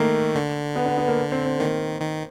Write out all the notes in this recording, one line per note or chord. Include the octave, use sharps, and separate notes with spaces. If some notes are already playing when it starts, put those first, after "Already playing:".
Already playing: D#3 A3 A#3
D3
B3
B3
B3
A#3
C4
C4
D#3 A#3
D#3